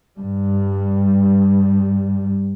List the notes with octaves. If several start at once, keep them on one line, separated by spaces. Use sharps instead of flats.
G2 G3